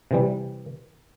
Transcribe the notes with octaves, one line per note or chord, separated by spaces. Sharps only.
C3 E3 G3